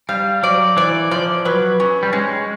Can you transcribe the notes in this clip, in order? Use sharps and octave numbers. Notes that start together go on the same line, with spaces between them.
G3 F5
F#3 D5
E3 D5
F3 D5
F#3 B4
C#4
G3
G#3 C#4